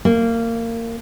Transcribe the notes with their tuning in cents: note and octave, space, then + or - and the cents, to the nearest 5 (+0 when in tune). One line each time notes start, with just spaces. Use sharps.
A#3 -25